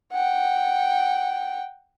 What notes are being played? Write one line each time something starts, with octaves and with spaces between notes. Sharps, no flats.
F#5 G5